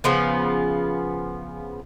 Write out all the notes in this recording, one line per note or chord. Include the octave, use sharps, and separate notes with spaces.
C#3 F3 B3